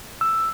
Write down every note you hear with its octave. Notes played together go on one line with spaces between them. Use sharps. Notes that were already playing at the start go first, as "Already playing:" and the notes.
E6